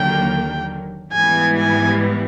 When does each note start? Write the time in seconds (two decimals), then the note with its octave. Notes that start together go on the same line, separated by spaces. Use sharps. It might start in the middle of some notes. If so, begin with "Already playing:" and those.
Already playing: D#2 D3 F#3 A#3 G5
1.13 G#2 E3 G3 B3 G#5
1.57 G#5